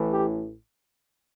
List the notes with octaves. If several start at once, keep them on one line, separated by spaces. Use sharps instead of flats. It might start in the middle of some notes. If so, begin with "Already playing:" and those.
Already playing: A1 A2 E3
G4